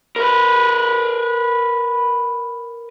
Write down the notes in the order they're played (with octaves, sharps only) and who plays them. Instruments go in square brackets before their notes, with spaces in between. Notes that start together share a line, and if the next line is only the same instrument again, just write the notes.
[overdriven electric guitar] A#4 B4